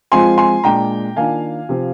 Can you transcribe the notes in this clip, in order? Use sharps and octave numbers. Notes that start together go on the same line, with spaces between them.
F3 G#3 C4 F4 G#5 C6
G#5 C6
A#2 G#3 D4 G5 A#5
D#3 A#3 D4 F4 F5 G#5
C3 F3 C4 F4